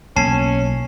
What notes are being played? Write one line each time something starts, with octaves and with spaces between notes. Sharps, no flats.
B1 A#3 C#4 A5 C7 E7